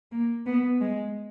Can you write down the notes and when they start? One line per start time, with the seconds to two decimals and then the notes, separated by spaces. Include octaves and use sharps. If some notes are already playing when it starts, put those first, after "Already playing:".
0.12 A#3
0.46 B3
0.81 G#3